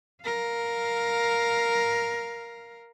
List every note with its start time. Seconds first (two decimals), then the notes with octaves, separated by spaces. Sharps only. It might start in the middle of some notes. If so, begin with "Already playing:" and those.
0.24 A#4 F5